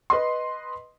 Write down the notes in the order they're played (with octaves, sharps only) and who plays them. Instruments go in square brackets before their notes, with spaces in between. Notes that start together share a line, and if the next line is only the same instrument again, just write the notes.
[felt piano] B4 D#5 C6